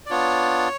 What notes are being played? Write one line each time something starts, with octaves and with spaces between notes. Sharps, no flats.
D5
B3 D4 F4 C#5